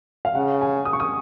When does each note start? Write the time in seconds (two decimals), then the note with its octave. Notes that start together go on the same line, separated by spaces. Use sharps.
0.25 F5
0.35 C#3 F#5
0.61 G#5
0.85 D#6
0.93 C#6
1.00 D#6